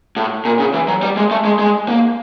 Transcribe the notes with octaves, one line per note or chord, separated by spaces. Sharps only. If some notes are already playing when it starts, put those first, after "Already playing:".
A2
A#2
C#3
E3
F#3
G3
G#3
A3
G#3
G#3
A#3